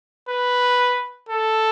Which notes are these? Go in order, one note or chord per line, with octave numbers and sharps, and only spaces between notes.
B4
A4